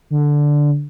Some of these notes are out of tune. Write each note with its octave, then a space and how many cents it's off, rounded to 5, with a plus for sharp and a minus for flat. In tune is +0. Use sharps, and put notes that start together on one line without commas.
D3 -5